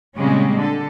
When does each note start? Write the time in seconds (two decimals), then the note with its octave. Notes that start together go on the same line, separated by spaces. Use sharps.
0.16 A#2 C#3 G3 G#3 C4 C#4
0.57 D3 A4